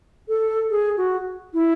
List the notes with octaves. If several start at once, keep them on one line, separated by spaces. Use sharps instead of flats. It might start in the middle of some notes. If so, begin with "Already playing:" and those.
A4
G#4
F#4
E4